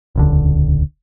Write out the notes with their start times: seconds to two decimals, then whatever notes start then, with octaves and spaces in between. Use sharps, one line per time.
0.16 D#1 C#2 D3